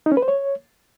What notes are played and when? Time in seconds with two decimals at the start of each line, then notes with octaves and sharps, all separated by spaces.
0.06 D#4
0.12 C#4
0.17 B4
0.22 C5
0.28 C#5